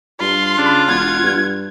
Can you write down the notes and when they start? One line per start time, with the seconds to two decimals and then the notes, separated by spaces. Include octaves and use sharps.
0.21 G2 F4 C6
0.58 C#3 D4
0.89 E1 F#5 G#6
1.23 G2